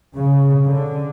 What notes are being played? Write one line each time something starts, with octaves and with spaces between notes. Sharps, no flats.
C#3
D3